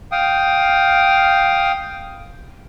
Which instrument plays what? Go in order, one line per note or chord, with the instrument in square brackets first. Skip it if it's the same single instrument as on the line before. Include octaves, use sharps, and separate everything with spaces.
[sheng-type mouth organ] F5 G5 D#6